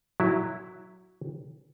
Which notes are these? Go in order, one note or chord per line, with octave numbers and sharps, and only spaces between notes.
F#3 E4